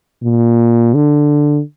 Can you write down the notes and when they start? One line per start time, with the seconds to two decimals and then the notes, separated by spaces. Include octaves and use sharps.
0.23 A#2
0.94 D3